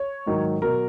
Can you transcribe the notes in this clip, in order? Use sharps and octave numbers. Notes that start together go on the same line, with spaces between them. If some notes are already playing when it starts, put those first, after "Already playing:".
Already playing: C#5
G#2 D#3 F#3
B2 F#3 A#4